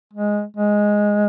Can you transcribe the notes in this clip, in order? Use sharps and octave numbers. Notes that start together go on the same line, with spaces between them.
G#3
G#3